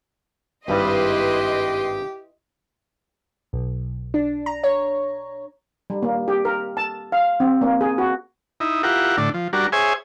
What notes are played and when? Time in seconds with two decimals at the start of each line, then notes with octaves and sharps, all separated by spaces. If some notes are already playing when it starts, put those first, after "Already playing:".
0.68 G#1 G2 G3 E4 G4 B4 D#5 C6
3.53 B1
4.14 D4
4.46 A#5
4.64 C#5
5.90 G3
6.02 A#3
6.28 G4
6.45 A#4
6.77 A5
7.12 F5
7.40 C4
7.61 A#3
7.81 G#4
7.98 F#4
8.60 D#4 E4
8.83 E4 F4 G4 A#4 F#5
9.17 A2 D3 D4
9.34 F3
9.53 G3 D4 F#4 A#4
9.72 G#4 C5 C#5 E5 G#5